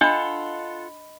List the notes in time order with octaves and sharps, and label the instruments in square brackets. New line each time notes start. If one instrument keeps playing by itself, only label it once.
[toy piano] D4 [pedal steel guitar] F4 A4 F#5 [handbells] D#5 B5